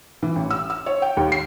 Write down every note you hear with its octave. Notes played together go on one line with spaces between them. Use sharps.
E3
A1
E6
E6
C#5
G5
D#2
C7